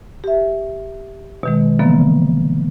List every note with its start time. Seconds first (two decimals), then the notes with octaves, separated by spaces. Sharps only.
0.24 G4 E5
1.43 B2 D#3 G#3
1.79 D3 E3 F3 A#3 B3